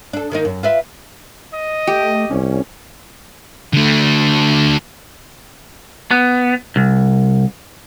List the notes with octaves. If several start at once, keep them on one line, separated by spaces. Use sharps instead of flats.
D4 A4
D#3 A#3 D#4
F#2
F4 B4 E5
D#5
A3 G4
C2 C#4
D3 A3
B3
C2